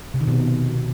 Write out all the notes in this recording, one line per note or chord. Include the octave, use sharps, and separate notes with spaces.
C3
D#3
B2